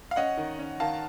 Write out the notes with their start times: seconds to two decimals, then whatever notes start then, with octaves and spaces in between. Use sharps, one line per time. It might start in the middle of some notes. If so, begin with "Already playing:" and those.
0.11 F5
0.16 C#4 D#5 F#5
0.37 D#3
0.59 C#4
0.80 D#3 F5 A5